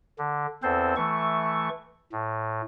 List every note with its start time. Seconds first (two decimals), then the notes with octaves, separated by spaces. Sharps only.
0.19 D3
0.63 E2 C4 A4 C5
0.97 E3 A3 C#6
2.12 A2